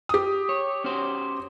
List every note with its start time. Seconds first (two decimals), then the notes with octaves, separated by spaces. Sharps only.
0.09 G4 D#6
0.49 C#5
0.84 C#4 F#4 C5